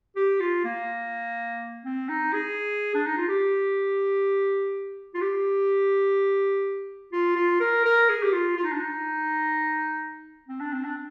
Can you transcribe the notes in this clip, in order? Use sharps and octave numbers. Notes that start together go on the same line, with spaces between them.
G4
F4
A#3
C4
D#4
G#4
D4
D#4
F4
G4
F4
G4
F4
F4
A#4
A#4
G#4
G4
F4
F4
D#4
D4
D#4
C4
D4
C4
D4